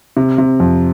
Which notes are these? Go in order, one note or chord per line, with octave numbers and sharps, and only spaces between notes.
C3
C3
F2